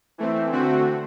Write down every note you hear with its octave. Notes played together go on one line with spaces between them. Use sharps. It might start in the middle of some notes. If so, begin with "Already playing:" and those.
E3 A3 C4
D3 A3 C4 F#4